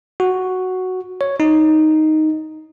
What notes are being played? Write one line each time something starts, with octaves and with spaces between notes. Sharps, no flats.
F#4
C#5
D#4